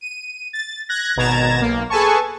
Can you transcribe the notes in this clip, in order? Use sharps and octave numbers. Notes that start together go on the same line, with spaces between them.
D#7
A6
F#6 G#6 A#6
G#1 B2 A#5 G#6 A6 E7
B1 A#3
G#4 A4 B4 G#5 A5 C#6